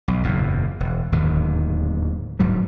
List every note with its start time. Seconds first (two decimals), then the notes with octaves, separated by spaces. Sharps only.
0.08 B1
0.23 F#1 E2 A#2
0.80 E1
1.12 D1 D#2 G#2 D#3
2.39 D1 G#2 F#3 G3